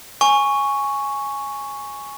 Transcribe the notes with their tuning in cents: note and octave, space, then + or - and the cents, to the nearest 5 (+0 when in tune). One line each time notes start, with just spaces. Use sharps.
G#5 +0 C#6 +0